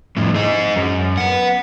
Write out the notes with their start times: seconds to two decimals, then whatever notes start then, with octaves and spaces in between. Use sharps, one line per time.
0.17 F2 A2
0.35 G#3 D#4
0.76 F#2
1.17 B3 F#5